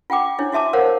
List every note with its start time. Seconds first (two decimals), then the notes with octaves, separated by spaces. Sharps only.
0.10 F4 F#5 G5 D6
0.38 D4 E4 C#5
0.52 E4 F#4 E5 A5 D6
0.73 A#4 C5 C#5 F5 F#5